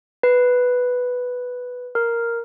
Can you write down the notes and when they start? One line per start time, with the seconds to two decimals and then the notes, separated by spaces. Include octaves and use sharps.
0.23 B4
1.95 A#4